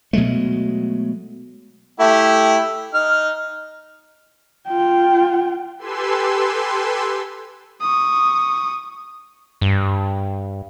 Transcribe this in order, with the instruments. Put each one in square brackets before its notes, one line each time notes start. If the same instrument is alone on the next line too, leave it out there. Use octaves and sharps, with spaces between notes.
[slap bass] B2 F#3 G#3 A3
[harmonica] A3 E4 G4
D#4 F6
[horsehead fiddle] F4 G5
[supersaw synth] G4 A4 B4 G#5 C6 E6
[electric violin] C#6 D#6
[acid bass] G2